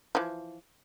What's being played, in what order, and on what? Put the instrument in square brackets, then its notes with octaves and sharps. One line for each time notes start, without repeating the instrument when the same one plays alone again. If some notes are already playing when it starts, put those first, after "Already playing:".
[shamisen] E3 F3